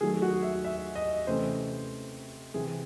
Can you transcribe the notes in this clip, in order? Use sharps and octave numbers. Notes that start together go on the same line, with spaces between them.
D#3 F#3 A3 G#4
F#4
E5
E5
D#5
C3 E3 A3 C#4 C5
C3 E3 C4 G#4